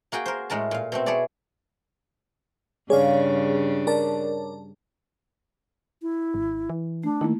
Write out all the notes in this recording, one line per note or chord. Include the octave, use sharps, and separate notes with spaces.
A#3 F#4 G#4 G5
A#4 C5
A2 G#3 A#4 A5
A#2 F5
B2 A3 C4
E4 G#4 A4 C#5 D5
G2 C#3 D4 G#4 C#5 D5 F5
A#4 D5 A5
E4
G#1
E3
A3 D4
D#3 A3 A#3 E4